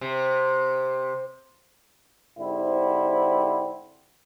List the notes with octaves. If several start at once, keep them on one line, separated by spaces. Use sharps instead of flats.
C3
G#2 D3 C4 E4 G4 C5